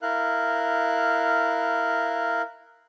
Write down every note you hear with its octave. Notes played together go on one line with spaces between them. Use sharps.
E4 A#4 F5 F#6